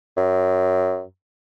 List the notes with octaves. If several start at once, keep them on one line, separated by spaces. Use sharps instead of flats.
F#2